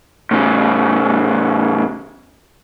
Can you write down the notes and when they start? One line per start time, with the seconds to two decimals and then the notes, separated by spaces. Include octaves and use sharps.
0.31 A2 C#3